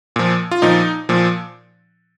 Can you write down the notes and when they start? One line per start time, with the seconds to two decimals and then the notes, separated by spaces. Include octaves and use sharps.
0.16 A#2 F3
0.51 F4
0.62 A#2 F3 D#4
1.09 A#2 F3